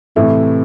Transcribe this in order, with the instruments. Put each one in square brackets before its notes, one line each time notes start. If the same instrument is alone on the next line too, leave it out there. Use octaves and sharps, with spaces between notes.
[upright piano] A2 E3 A3 E4 [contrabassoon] C3